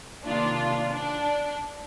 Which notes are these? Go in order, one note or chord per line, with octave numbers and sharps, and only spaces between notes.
C3 D#3 A#3 D4 F4
D4